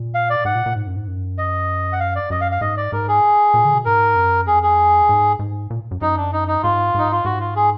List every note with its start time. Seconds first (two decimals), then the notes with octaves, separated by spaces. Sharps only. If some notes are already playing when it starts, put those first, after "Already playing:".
Already playing: A#2
0.15 F5
0.30 D5
0.45 G#2 F#5
0.55 A#2
0.66 A#2
0.76 G#2
0.87 F#2
0.96 G#2
1.08 F#2
1.38 D#5
1.93 F#5
2.00 F5
2.16 D5
2.30 F#2 D#5
2.41 F5
2.52 F5
2.61 G#2 D#5
2.77 D5
2.92 G#2 A#4
3.08 G#4
3.54 A#2
3.65 D3
3.74 B2
3.85 G#2 A#4
4.16 F#2
4.47 F2 G#4
4.63 G#4
5.09 G#2
5.39 G#2
5.70 A#2
5.91 F#2
6.01 F#2 D#4
6.17 D4
6.33 D#4
6.48 D#4
6.63 G#2 F4
6.95 G#2 D#4
7.12 F4
7.25 G#2 F#4
7.40 F4
7.56 G#4